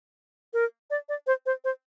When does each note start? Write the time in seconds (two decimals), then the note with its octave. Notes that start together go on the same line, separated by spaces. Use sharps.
0.54 A#4
0.90 D5
1.09 D5
1.27 C5
1.46 C5
1.64 C5